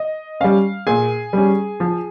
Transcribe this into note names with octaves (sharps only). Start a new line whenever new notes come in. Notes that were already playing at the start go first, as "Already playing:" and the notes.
Already playing: D#5
G3 C#4 F5
A#2 G#4 G#5
G3 C#4
F3